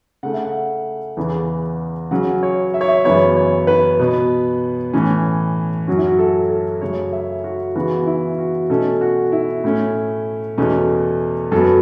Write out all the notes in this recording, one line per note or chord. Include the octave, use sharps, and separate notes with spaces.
C#3 A3 C#4 F#5
E5
F#5
E2 C#3 E3
C#3 F#3 C#4 F#5
C#5
E5
C#5
E5
F#2 C#3 E3 B3 C#5
C#5
B4
B2 B3
A2 E3 C#4
F#2 F#3 C#4 F#4
E4
F#4
A4
A4
F#2 C#3 A3 C#5
E5
F#4
C#3 E3 B3 F#4
E4
F#4
B2 A3 C#4 A4
F#4
E4
A2 A3 C#4
E2 B2 A3 C#4
F#2 F#3 B3 A4